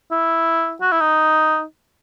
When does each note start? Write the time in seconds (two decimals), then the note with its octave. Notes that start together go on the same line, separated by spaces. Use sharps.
0.11 E4
0.81 F#4
0.92 E4
1.00 D#4